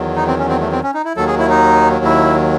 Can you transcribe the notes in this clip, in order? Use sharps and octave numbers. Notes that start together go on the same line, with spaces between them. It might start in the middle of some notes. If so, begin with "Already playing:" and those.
Already playing: E2 D#3 F#3
D#4
C4
C#4
C4
A3
C4
C#4
D#4
E4
D#2 D#3 F#3 A4
G#4
E4
D#4
E4